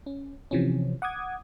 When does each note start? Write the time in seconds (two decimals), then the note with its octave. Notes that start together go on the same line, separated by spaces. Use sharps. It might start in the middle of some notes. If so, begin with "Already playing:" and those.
0.06 C#4
0.51 C3 E3 F3 C4 C#4
1.02 F#5 D6 D#6 G#6